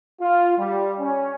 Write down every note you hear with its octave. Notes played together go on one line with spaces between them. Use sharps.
F4
G3
C#4